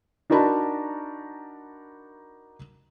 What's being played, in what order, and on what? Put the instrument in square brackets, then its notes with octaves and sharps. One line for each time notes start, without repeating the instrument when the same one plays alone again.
[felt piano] D4 D#4 F#4 A#4 A5 B5